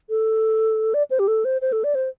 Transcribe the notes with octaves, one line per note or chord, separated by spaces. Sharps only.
A4
D5
C5
G4
A4
C5
C5
A4
D5
C5